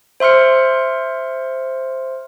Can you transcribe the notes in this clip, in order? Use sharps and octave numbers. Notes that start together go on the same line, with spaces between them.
C5 E5 C6 F6 C#7